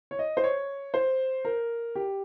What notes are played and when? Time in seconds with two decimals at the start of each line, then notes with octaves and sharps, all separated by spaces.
0.11 C#5
0.19 D#5
0.37 C5
0.44 C#5
0.94 C5
1.45 A#4
1.95 G4